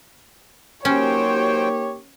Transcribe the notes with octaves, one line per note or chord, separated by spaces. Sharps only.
F#3 A#3 C#4 D#4 G4 C5 C#5 G5